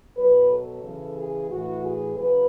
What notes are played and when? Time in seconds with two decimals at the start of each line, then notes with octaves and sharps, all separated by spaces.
0.17 B2 F#3 B4
0.50 A4
0.83 C#3 E3
1.17 G#4
1.51 A2 E3 F#4
1.83 G#4
2.17 C#3 F#3 B4